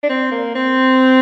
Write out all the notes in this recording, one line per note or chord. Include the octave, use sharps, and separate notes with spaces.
D4
C4
A#3
C4